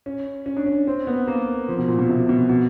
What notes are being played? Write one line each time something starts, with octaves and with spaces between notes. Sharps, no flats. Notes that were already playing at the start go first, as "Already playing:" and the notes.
C#4
C#4
D4
C#4
C4
B3
A#3
F3
B2
A#2
B2
C3
B2
B2